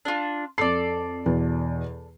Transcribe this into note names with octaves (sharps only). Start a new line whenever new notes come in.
D4 F4
F2 A4 D5 C7
E2 B2